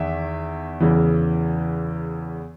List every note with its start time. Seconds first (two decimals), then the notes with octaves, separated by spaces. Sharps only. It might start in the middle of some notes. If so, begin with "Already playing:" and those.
Already playing: E2 D#3 E5
0.80 E2 C#3 E3